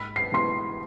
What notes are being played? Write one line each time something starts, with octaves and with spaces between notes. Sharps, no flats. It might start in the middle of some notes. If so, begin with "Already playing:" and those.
Already playing: G#2 B5 B6
C7
E3 G#3 B3 C6 C7